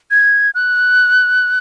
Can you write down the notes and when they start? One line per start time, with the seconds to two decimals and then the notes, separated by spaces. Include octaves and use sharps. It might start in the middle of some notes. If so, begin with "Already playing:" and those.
0.11 G#6
0.55 F#6